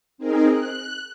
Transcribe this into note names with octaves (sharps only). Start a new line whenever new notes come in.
C4 D#4 G#4 A#4
F#6